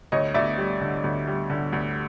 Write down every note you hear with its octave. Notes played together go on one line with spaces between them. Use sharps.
D2 C#5 D#5
D2 D5 E5
G3
D3
D2
G3
D3
D2